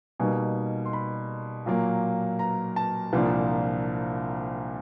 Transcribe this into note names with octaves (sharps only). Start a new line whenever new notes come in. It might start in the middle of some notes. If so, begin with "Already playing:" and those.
B2 G3 A#3 D#4 G#5
C6
B5
A#2 F#3 A#3
A#5
A5
C2 A#2 F3 A#3 D4